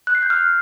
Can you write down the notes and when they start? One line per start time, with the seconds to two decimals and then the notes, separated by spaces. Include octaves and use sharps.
0.07 F#6
0.15 C7
0.22 G6
0.30 F6